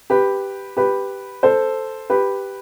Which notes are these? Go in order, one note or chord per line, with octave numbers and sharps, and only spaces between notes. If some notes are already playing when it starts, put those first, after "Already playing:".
G4 B4
G4 B4
A4 C5
G4 B4